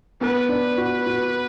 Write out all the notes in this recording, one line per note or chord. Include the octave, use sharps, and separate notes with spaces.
B3 B4
D4
F#4
F#4